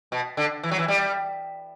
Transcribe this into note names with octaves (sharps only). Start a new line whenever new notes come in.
B2
D3
E3
F#3
E3
G3